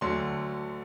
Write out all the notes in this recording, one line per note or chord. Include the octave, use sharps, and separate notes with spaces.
D2 D3 F#3 C6